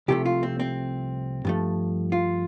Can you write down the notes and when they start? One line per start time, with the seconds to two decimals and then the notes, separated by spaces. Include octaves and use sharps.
0.08 C2 C3 F3 A3 G4
0.26 F4
0.43 C4
0.60 C4
1.45 G2 F3 A3
2.12 F4